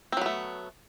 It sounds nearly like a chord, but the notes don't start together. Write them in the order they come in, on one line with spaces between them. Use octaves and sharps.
C4 F#3 B3 A3